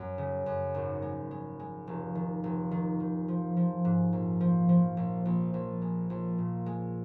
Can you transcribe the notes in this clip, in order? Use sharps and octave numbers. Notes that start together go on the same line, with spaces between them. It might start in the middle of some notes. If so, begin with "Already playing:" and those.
Already playing: F#2
C#3
F#2
G#1
G#3
G#3
G#3
F1
D#3
F1
D#3
D#3
F3
F3
G#2
A#1
F3
F3
A#1
A#1
A#1
G#3
A#1
A#2
G#3